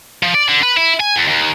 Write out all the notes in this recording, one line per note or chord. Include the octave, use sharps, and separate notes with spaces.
F3
D5
D3
B4
E4
G#5
E2
D#2